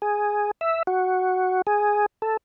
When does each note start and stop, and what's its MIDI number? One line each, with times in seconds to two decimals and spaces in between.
0.02 0.51 68
0.61 0.83 76
0.87 1.62 66
1.67 2.06 68
2.22 2.37 69